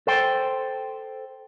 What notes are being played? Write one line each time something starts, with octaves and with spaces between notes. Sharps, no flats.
A4 C5 G5